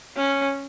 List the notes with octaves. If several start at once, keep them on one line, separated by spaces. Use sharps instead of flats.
C#4